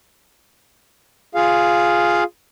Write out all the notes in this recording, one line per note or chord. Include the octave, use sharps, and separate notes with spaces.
F4 G#4 F5